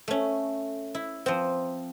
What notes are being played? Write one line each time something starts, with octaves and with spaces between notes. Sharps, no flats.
A3 C#4
E4
F3 C4